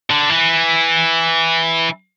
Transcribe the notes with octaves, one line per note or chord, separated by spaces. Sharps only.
D3
E3